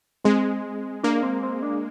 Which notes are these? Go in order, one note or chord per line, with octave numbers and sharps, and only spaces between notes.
G#3 C4
A#3 D4
C4
C4
D4